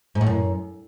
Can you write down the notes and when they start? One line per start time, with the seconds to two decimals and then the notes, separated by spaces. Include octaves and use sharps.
0.15 G#2
0.21 A2
0.26 F#2